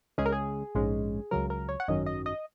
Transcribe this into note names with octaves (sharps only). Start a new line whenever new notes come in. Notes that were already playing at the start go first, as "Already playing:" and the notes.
C#2 C#3 G#3 C#4 G#4
A#4
G#4
A#1 G#2 G#3 C#4
C#2 C#3 F#3 A#4
A#4
C#5
F#5
G#1 F#2 D#3 F#3 C#4 D#5
D#5
D#5